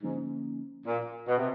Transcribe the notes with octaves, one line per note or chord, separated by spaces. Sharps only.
G#2 D3 F3 A#3 C#4
A#2
B2
C3